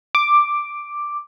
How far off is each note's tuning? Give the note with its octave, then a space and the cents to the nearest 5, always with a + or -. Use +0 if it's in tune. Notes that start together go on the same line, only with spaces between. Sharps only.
D6 +5